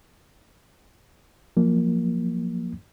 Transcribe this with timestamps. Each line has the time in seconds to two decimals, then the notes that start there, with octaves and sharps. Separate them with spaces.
1.57 F3 F#3 A#3